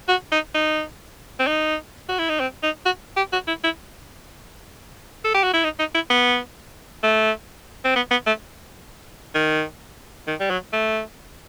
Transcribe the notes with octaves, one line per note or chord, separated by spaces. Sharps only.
F#4
D#4
D#4
C4
D#4
F#4
E4
D#4
C4
D#4
F#4
G4
F#4
E4
E4
A4
G4
F#4
E4
D#4
D#4
E4
B3
A3
C4
B3
B3
A3
D#3
D#3
G3
F#3
A3